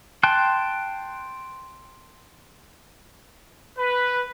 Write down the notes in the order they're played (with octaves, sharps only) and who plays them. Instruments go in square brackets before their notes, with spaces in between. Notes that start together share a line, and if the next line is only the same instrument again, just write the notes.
[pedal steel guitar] G5 A5 C6 F#6
[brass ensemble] B4